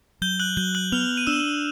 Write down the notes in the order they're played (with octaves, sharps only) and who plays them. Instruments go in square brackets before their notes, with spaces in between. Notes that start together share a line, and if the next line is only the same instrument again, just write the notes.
[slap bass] F#3 [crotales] G6 G7
[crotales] F#6 F#7
[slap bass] F#3 [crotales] G6 G7
[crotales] F#6 F#7
[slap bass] B3 [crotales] F6 F7
[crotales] D#7
[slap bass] D4 [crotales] E6 E7